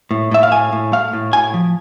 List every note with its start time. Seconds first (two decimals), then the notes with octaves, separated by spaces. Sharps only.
0.11 A2
0.31 A2 E5
0.43 F5
0.51 A2 G#5
0.72 A2
0.92 A3 F5
1.13 A2
1.33 A2 G#5
1.54 F3